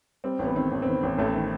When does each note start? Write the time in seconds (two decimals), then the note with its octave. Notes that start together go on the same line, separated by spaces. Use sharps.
0.24 G3 C4
0.39 A1
0.45 B3
0.55 D#3 C4
0.71 A1
0.82 C4
0.87 D#3 B3
1.03 A1
1.18 A1 A3
1.35 D#3